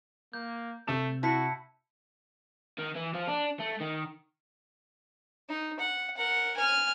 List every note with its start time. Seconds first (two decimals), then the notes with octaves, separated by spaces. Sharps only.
0.33 A#3 G6
0.88 C3 A3 E6 E7
1.23 E4 F#4 A5 B6 C#7
2.79 D#3
2.96 E3
3.14 F3
3.28 D4
3.60 A3
3.81 D#3
5.49 D#4
5.79 F#5
6.17 A#4 F#5
6.57 G#5 F6